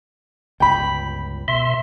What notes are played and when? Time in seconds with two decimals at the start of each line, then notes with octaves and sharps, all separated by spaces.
0.60 G1 C#2 G5 B5
1.48 B2 E5 C6